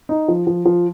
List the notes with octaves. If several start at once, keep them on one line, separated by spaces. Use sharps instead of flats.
D#4
F3
F3
F3